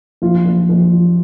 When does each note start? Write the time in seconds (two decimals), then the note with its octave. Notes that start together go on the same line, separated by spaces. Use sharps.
0.22 A#1 F4
0.46 A#1
0.69 A#1
0.92 F3